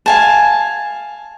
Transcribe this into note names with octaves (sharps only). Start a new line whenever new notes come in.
F5 G#5 A5